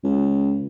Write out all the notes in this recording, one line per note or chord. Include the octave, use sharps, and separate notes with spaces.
C#2